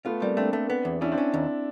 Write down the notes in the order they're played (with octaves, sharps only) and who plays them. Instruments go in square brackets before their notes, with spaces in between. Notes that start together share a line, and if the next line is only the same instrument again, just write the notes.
[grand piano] A3 B3 [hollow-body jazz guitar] F4
[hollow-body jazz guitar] G3 [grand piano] A#3 C4
[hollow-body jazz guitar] A3 [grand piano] C4 D4
[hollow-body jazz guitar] A3
B3
E2
[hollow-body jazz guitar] C#4 [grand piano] D4 E4
[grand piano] C4 D4
[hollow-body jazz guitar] C#4
D#2